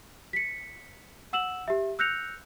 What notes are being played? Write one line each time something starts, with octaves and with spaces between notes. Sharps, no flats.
B6 C#7
F#5 E6 E7 F#7
G4 E5
E6 F#6 G6 A#6 C#7 F7